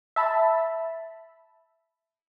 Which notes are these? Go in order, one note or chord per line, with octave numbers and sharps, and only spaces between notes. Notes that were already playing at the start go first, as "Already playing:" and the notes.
E5 A5 B5